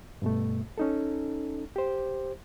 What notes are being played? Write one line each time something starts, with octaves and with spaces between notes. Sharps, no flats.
G2 B2 A3
C#4 D#4 A4
G4 C5